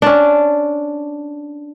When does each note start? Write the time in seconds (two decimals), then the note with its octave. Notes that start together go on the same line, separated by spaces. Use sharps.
0.02 C#4 D4